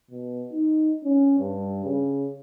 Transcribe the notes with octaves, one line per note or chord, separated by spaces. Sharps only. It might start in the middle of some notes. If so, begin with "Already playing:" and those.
B2
D#4
C#4
G2
C#3